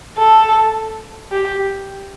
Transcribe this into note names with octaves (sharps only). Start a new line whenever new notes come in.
A4
G4